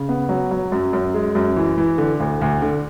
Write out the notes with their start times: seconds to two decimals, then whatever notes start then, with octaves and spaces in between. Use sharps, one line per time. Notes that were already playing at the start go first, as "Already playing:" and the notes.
Already playing: C#3
0.09 B3
0.29 F#3
0.51 F#3
0.72 F#2
0.93 F#2
1.14 G#3
1.35 F#2
1.56 E3
1.77 E3
1.98 D3
2.20 D2
2.42 D2
2.62 D3